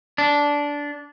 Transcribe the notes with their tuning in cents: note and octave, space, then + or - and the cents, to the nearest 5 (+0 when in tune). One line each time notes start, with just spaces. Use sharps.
D4 -15